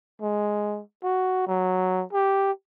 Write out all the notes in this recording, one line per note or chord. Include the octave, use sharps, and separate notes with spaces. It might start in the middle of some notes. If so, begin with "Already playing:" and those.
G#3
F#4
F#3
G4